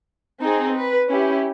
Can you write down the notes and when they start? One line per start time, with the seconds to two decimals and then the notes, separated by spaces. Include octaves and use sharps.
0.42 C4 D#4 G#4
0.76 B4
1.10 C#4 E4 G4